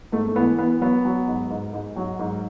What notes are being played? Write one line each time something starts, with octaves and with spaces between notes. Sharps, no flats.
G#2 A3
A3
E3 B3
E3 B3
F#3 B3
F#3
G#2
G#2
G#2
F#3
G#2